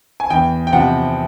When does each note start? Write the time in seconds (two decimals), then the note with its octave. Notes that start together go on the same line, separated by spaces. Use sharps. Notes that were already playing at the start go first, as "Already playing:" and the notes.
0.20 G#5
0.30 E2 G5
0.67 G5
0.73 C3 F3 F#5